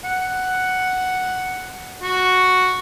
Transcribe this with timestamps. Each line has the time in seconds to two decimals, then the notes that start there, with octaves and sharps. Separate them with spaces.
0.04 F#5
2.03 F#4